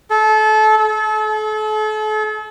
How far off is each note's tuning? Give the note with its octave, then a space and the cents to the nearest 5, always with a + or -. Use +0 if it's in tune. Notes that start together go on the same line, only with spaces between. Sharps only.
A4 -30
A4 -40